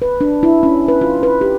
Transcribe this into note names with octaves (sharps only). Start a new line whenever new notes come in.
B4
D4
E4
C#4
B4
F4
B4
G4